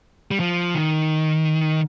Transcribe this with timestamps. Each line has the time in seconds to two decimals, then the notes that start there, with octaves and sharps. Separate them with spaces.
0.31 G3
0.40 F3
0.75 D#3